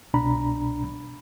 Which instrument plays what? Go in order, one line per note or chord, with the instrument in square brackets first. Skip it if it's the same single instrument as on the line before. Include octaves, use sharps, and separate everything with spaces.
[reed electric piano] C2 B2 D4 A#5 B5